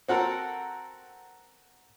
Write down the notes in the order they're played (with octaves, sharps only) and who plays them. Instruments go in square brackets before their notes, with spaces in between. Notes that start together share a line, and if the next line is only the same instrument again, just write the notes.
[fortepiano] C4 F#4 A4 A#4